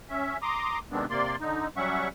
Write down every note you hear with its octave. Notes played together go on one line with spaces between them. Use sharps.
C#4 E5
A#5 C6 D6 D#6
C3 D#3 G#3 B3 C4 D4
C3 A#3 D5 C6
D3 D#4
F#3 G3 C#4 E5 F#5 C#6